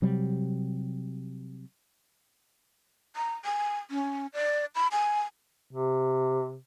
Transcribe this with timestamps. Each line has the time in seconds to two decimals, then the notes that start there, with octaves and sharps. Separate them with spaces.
0.02 C3 F#3 G3
3.16 A#5
3.45 G#5
3.91 C#4
4.34 D5
4.75 B5
4.92 G#5
5.71 C3